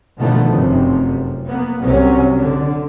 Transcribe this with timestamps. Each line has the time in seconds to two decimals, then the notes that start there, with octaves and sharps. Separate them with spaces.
0.18 B2 D3 D#3 F3 A3 B3
0.49 F1 F#2 C3
1.45 A#3 B3
1.82 C2 C3 F#3 C#4
2.38 D3